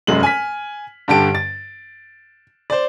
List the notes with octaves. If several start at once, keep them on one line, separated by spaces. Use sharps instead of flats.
F1 F#2 G#3 F#7
G#5 F6 B6
G2 D3 G4 A5 D7
A6
C5 D5